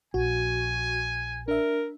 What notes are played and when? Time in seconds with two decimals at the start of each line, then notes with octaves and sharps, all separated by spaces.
0.14 A#1 F#4 G#5
1.48 D4 A#4 E5